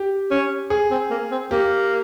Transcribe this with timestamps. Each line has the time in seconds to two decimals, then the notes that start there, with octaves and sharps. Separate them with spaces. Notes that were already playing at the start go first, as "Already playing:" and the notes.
Already playing: G4
0.31 C#4
0.70 G#4
0.91 C4
1.10 A#3
1.31 C4
1.51 A#3 G4